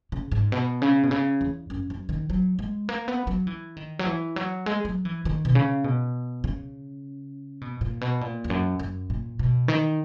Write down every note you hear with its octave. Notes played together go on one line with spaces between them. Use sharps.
C#3
G#2
B2
C#3
B2
C#3
E2
F#2
F#2
D#3
F#3
G#3
A#3
B3
F#3
E3
D#3
F#3
E3
F#3
G#3
F#3
E3
D#3
B2
C#3
B2
C#3
B2
A#2
B2
A#2
E2
F#2
F#2
A#2
B2
D#3